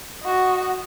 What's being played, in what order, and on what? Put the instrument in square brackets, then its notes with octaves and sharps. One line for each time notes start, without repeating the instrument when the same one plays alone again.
[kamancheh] F#4 D#5